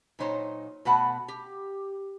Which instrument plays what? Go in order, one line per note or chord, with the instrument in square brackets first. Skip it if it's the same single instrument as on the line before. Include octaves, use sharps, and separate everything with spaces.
[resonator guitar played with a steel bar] A#2 F#3 D#4 C5 C#5
B2 A3 B4 F#5 A5
G4